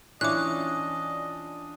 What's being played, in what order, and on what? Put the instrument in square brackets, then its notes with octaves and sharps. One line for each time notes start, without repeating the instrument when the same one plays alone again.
[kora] E3 C#4 [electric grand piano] D4 F4 D5 [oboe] D#5 [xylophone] D6 F#6